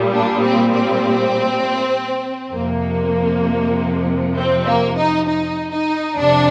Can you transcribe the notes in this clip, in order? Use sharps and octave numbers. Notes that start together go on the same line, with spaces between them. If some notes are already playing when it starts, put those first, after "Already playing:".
Already playing: A#2 G3
D4
C4
C4
F2 C3 F3 A#3
C4
A#3
D#4
D#4
D#4
F2 C3 D4